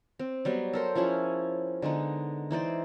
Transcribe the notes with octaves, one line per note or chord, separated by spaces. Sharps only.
C4
F#3 G3 B3
A4 A#4 C5
F3 C#4 E4 G#4
D3 G#3 B3 D#4
E3 D#4 C5 D5